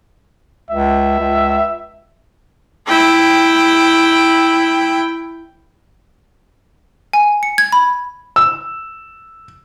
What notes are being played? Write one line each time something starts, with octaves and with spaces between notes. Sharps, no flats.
C#2 E5
C#2
E4 G5
G#5
C#7
G#6
B5
E6